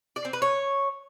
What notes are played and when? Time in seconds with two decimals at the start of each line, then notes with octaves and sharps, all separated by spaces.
0.16 D5
0.25 C4
0.33 B4
0.42 C#5